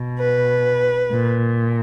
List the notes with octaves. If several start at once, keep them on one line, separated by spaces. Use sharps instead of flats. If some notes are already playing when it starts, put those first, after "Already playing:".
Already playing: B2
B4
A#2